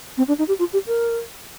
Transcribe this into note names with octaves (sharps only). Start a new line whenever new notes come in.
C4
D4
D#4
G4
F4
G4
A#4